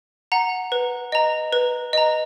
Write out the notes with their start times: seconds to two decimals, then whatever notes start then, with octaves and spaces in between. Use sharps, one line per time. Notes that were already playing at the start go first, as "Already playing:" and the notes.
0.32 F#5 A#5
0.72 B4
1.12 D#5 A#5
1.53 B4
1.93 D#5 A#5